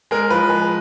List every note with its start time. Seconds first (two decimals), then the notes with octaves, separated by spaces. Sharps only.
0.11 G#3 A#4
0.30 F3 B4
0.50 G#3